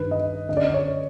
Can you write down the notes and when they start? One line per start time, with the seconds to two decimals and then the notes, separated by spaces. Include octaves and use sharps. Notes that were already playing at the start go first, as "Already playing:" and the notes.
Already playing: G2 D#3 B4
0.11 D#5
0.49 F#2 D3 D#5
0.57 D5
0.64 D#5
0.74 C#5